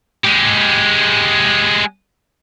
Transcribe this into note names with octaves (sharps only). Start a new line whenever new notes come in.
G#3 G4